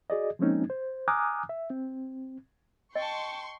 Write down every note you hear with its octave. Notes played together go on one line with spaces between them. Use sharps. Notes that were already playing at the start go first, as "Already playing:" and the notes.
F#4 G#4 D5 D#5
F3 G#3 A#3 C4 C#4 D#4
C5
G#5 A#5 D6 D#6 F6 F#6
E5
C4
D#5 G5 A5 C6 C#6